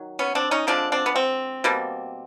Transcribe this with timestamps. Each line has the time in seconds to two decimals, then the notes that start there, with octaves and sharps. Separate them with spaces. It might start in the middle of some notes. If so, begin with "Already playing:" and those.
Already playing: D#3 F#3
0.19 B3 C#4
0.35 C4 D4
0.51 C#4 D#4
0.67 D3 F3 G#3 C4 D4
0.92 C4 D4
1.06 B3
1.16 C4
1.64 B2 G3 A#3